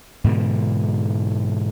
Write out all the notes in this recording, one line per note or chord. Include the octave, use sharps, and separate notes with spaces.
G#2 B2 D3 E3